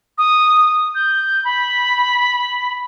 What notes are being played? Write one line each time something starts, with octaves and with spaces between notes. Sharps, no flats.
D#6
G6
B5